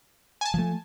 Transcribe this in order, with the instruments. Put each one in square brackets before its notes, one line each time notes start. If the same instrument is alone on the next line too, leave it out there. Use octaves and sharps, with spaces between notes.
[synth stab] G#5 A5
[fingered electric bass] F3 A3